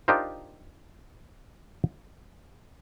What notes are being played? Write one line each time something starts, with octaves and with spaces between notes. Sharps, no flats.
D4 D#4 F4 G4 A#4 C5